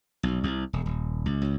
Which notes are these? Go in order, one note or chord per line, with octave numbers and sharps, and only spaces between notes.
B1
C2
E1
D#1
C#2
C#2